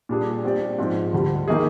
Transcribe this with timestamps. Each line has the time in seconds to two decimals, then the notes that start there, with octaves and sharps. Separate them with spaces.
0.09 A#2 G3 D4 G#4
0.44 G3 C4 G4 D5
0.78 G#2 F3 G#3 C4 F4
1.13 D2 D3 G3
1.48 D#3 A#3 D#4 G#4